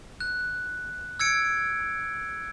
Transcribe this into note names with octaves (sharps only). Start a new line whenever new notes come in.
F#6
E6 G#6 C#7 D7